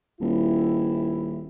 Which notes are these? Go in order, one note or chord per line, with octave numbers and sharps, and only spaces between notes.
D#1 E4